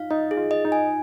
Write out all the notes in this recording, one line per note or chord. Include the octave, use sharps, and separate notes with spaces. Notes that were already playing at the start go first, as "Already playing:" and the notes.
Already playing: D#4 F4 F5
D#4 D#5
G#4
F4
D#5
D#4
G#5